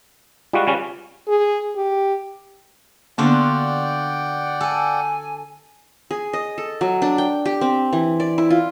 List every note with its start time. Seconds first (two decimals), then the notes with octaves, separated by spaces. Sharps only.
0.53 G3 G#3 F4 F#4
0.67 C#3 G3 C#4
1.28 G#4
1.76 G4
3.18 D3 A#3 B3 F4 F#4 D5 F#5 G5
4.61 A4 G#5
6.11 G#4
6.33 D#5
6.58 A4
6.81 F#3
7.02 D4
7.18 G5
7.45 G4
7.61 C4
7.93 E3
8.20 D5
8.38 E4
8.50 F4